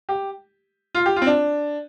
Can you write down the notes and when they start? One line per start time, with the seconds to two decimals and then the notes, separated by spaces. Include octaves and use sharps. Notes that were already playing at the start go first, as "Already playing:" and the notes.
0.09 G4
0.95 F4
1.06 G4
1.16 F4
1.22 C4
1.27 D4